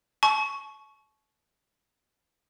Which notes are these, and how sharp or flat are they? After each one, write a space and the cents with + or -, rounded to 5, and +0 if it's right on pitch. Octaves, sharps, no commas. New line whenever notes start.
A5 -40 C#6 +0